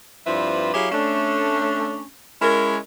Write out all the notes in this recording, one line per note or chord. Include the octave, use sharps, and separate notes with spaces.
G2 F3 C4 E4 B4 D5
F#3 E4 G4 G#4 C#5 F5
A3 C#4 D4
G#3 C#4 E4 A#4